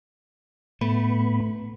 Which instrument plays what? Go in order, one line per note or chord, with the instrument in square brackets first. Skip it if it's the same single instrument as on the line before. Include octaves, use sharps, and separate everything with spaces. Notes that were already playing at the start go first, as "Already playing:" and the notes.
[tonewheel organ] A2 B3 B5 [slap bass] A3